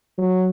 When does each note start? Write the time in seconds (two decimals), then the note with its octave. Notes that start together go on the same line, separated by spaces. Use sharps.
0.18 F#3